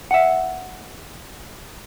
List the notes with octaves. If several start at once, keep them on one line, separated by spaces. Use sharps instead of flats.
E5 F#5